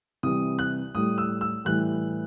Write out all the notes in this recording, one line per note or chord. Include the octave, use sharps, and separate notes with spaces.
C3 E3 G3 D#6
F#6
A2 G3 D#6
E6
E6
A2 E3 G3 F#6